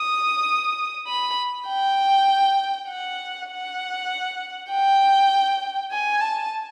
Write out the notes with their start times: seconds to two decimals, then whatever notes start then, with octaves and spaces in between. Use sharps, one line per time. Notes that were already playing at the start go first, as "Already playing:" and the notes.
Already playing: D#6
1.07 B5
1.67 G5
2.88 F#5
3.49 F#5
4.70 G5
5.91 G#5
6.20 A5